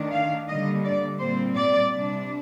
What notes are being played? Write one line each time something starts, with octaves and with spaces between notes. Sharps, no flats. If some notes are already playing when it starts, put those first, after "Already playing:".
Already playing: D#3 A3 D4
F5
D3 G3 A#3 D#5
D5
A#2 G3 C4 C5
D5
C3 G3 D4